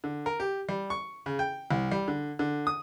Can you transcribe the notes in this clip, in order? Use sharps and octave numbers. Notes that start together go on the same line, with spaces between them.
D3
A#4
G4
G3
C#6
C#3
G5
C2
G3
D3
D3
D#6